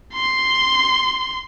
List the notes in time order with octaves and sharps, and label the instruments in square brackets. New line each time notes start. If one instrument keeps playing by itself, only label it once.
[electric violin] C6